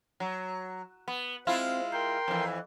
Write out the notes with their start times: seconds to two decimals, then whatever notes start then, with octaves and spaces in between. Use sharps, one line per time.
0.20 F#3
1.08 B3
1.47 G#3 C4 E4 F4
1.93 A#4 G5 C6
2.28 F2 E3